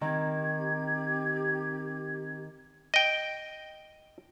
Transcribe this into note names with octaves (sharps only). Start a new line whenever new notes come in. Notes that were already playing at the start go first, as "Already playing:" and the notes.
D#3 C4 G4 G#6
D#5 G5